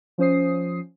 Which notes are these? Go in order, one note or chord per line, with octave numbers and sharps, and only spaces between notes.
F3 C#4 C5 D#6 C7